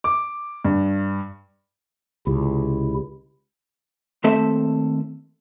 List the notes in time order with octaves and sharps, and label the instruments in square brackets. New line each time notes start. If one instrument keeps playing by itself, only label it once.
[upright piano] D6
G2
[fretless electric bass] C#2 [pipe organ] C3 E4
[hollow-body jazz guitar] D#2 A3 C4 A4 E5